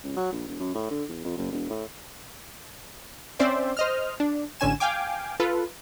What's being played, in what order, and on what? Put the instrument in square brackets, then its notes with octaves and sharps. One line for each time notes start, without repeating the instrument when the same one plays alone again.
[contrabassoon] C#2
F#3
A#1
E1
F#2
A2
D3
E2
F2
F#1
E1
A2
[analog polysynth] C4 C#4 C5 D5 E5
C5 D#5 F6
D4
A1 D3 C#4 G#5 E7
F5 G5 G#5 D6
F4 A4 B4